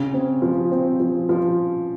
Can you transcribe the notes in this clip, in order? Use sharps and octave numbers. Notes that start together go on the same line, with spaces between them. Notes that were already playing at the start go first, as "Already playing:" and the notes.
Already playing: C#3
C4
F3
C4
F3
F3